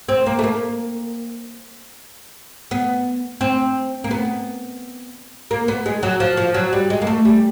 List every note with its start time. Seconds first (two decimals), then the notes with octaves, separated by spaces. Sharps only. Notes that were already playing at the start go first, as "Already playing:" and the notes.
0.09 C4
0.26 A#3
0.39 A3
0.43 A#3
2.71 B3
3.41 C4
4.04 A#3
4.11 B3
5.51 A#3
5.68 B3
5.86 G#3
6.03 F#3
6.20 F3
6.37 F3
6.54 F#3
6.73 G3
6.90 G#3
7.02 A#3
7.07 A3
7.25 G3